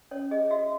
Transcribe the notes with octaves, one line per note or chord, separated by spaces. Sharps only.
C#4 C#5
G#4 D#5
F#4 E5